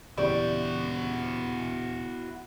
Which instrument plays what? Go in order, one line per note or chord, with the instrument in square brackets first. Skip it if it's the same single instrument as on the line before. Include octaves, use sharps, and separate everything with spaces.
[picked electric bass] D#1 C#3 E3 [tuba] B3 [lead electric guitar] E4 F#4 [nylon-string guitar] G4 D5